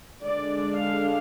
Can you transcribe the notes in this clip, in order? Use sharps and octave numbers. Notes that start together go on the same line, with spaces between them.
D3 G#3 D4 D5
F5